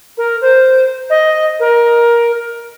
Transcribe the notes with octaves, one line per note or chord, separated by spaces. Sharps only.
A#4
C5
D#5
A#4